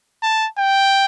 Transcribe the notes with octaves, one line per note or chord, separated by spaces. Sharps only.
A5
G5